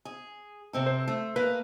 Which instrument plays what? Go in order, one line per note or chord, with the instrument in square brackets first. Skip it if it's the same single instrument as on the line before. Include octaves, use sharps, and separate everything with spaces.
[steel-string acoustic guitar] G#4
C3 C4 A4
[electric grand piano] C5
[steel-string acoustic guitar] A3
[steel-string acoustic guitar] A#3 [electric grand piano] B4